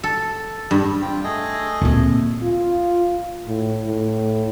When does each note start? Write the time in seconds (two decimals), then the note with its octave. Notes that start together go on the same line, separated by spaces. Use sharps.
0.04 A4
0.71 G2
1.01 C4 F4 G5
1.24 A3 G#4 D#5
1.82 D2 A#2 C4
2.43 F4
3.47 A2
3.86 A2